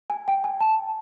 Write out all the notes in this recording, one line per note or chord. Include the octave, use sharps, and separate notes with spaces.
G#5
G5
G#5
A5